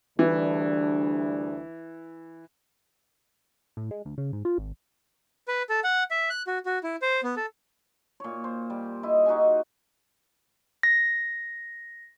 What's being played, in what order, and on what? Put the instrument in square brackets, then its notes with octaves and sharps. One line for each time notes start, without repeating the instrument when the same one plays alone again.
[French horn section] D2 G3 D4 [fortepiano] E3
[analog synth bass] A2
G#3
D2
C#3
G#2
F4
G#1
[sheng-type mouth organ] B4
A4
F#5
E5
F#6
F#4
F#4
E4
C5
B3
A4
[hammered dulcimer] A#2 C#5
C5
G3
E4 D#5
D#4 F#4 G#4 G#5
[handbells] A#6